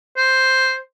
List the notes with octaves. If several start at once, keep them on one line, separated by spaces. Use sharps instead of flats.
C5